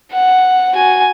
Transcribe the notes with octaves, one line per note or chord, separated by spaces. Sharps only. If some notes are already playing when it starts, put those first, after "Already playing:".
F#5
F#4 G#5